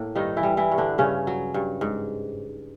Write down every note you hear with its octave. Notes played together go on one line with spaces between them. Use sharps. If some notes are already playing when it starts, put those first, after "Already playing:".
Already playing: A2 A#3
G2 D#3 D#4
E3 E4
G3
E3 E4
G2
D3 D4
G2 C#3 C#4
F#3
G2
G#2